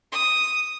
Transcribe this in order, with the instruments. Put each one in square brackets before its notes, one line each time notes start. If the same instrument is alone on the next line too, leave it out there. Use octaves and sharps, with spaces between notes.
[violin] D#6